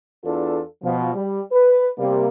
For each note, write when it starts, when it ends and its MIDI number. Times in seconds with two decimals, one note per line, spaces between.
0.25 0.61 40
0.25 0.61 62
0.25 0.61 65
0.25 0.61 69
0.83 1.13 47
0.83 1.13 53
1.14 1.41 55
1.52 1.88 71
1.99 2.28 48
1.99 2.28 55
1.99 2.28 58